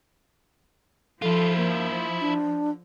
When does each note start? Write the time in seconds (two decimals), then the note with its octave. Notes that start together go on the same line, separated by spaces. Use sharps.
1.22 F3 E4 F4 A4
1.57 A#3
2.21 D4